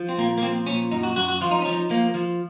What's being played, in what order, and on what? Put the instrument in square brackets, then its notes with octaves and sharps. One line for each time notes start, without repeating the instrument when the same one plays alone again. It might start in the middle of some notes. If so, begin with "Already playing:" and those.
Already playing: [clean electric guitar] F3
C4
A#2 A#3
A#3
F3 C4
A#2 C#4
F#2 D#4
F#4
F#2 F#4
F#4
F3 F4
D#4
F3 C#4
D#4
F3 A#3
F3